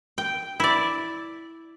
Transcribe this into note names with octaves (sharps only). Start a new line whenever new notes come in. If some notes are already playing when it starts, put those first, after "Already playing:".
G5
E4 D5